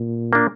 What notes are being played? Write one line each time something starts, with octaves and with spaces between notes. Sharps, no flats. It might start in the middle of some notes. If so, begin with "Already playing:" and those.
Already playing: A#2
A#3 D4